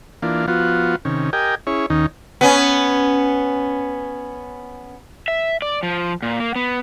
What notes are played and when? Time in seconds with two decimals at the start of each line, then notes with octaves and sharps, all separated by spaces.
0.22 E3 A#3 D4 F4
0.48 F3 B3 F4 F#4
1.05 C3 D#3 C#4
1.33 G4 A#4 D#5 G5 G#5
1.67 C#4 E4 G#4 C#5
1.90 D#2 D#3 C#4 D#4
2.41 B3 C#4
5.28 E5
5.62 D5
5.83 F3
6.23 A#2
6.40 A#3
6.56 B3